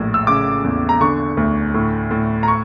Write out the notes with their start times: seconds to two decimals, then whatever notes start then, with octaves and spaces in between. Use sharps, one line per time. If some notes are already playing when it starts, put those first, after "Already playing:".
Already playing: A#1 A2
0.14 E6
0.27 C#3 D6
0.64 E2
0.89 A#5
1.01 D3 C#6
1.37 D2
1.74 A2
2.11 A2
2.43 A#5
2.48 C#6